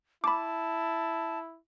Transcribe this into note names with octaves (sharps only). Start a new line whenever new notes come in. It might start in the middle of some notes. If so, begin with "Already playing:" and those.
E4 A5 B5 D6